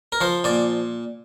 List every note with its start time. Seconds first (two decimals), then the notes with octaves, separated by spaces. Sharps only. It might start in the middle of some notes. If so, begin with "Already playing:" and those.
0.12 A#4
0.21 F3 C5
0.44 A#2 D5